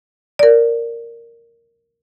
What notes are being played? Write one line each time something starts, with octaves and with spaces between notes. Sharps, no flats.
A#4 D5